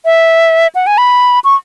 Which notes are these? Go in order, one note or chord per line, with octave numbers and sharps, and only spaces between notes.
E5
F#5
G#5
B5
C#6